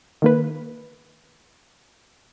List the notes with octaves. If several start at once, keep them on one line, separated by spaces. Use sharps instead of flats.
D#3 A#3 B4